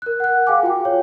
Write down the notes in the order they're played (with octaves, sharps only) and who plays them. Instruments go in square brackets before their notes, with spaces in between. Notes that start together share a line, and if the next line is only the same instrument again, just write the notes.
[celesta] A#4 F#6
F#5 F#6
G#4 F5 G5 G#5 D6
F4 F#4 G5
C#5